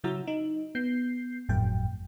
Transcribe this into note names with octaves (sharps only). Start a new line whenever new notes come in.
C#3 F#3 E4 F#4 A#5 E6
D#4
B3 G6 C7
G1 F2 A2 F#3 G5